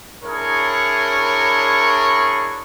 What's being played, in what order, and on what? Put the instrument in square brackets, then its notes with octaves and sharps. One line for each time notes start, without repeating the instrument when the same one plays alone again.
[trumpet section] D4 E4 G#4 A#4 C#5 C#6